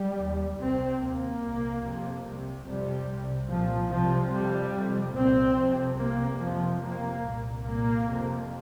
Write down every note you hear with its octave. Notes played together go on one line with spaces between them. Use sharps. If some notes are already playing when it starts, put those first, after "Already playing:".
Already playing: G3
D#2
C2 C3 C4
D#2 A#3
C2 A#2
F2 C3
C2 C3
F2 C3 G3
C2 C3
C2 A#2 F3
C2 C3 F3
F2 C3 G3
F2 C3
C2 A#2 C4
F2
C3
C2 C3 A#3
F2 C3 F3
F2 C3 A#3
C2 A#2
C2 A#2 A#3
F2 C3